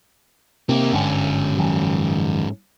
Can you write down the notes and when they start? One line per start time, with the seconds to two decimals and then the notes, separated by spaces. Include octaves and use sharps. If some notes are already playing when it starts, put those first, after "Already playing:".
0.69 C3 A#3 G4
0.93 G1 G#2 D3 C#4
1.57 F#1 D#3 F#3